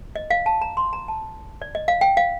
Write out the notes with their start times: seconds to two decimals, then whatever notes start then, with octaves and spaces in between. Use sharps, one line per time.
0.16 D#5
0.30 F5
0.46 A5
0.61 A#5
0.77 C6
0.93 A#5
1.08 A5
1.62 D5
1.75 D#5
1.88 F5
2.01 G5
2.17 F5